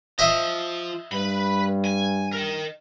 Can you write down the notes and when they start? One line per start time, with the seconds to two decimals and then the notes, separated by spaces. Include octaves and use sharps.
0.19 F3 D#5 E5
1.12 G2 B4 B5
1.85 G#5
2.32 A#4 D#5